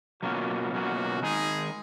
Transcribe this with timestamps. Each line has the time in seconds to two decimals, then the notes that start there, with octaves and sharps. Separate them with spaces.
0.23 B2 F#3 A#3 C#4 F4 F#4
0.72 B2 F#3 A#3 C#4 F4 F#4
1.22 D#3 G#3 D#4 G#4